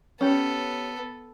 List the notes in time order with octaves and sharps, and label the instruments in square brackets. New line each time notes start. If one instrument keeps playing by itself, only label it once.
[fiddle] B3 A4 [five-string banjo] C#4 G4